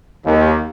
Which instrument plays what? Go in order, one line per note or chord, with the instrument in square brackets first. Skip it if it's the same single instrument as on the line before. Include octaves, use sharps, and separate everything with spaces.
[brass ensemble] D#2